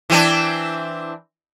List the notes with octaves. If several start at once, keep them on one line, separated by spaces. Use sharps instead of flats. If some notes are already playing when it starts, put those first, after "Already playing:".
E3 C4 D4